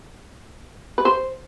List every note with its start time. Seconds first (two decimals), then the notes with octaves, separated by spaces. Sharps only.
0.98 B4
1.05 C5